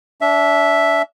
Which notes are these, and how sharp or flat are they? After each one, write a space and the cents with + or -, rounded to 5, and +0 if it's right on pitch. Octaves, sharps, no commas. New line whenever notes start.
D4 -30 E5 +0